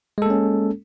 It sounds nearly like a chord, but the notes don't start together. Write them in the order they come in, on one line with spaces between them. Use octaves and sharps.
G#3 A4 A#3 C#4